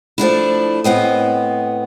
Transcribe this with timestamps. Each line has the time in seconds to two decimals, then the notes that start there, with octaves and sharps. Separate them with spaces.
0.18 F3 A3 D4 E4
0.84 A2 B3 C4 D#5